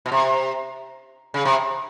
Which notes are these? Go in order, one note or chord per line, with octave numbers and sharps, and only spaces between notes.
B2
C3
C#3
C3